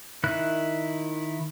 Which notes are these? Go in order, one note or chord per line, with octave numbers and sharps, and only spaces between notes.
D#3 E4 F#6